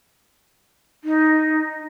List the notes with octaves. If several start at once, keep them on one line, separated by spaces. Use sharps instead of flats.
D#4